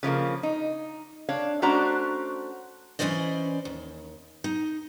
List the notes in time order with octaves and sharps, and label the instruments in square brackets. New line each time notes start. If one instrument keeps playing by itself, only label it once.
[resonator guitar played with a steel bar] C#3 F3 A3 A#3
D#4
D4 C#5 F5
A3 C#4 D4 F#4 C5 A#5
[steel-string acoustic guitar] E3 C#4 E4 C5 D5 D#5
D#2
D#4